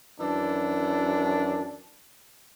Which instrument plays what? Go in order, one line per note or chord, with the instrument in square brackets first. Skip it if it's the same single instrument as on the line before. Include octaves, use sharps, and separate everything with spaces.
[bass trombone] F#2 [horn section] D#3 E3 D4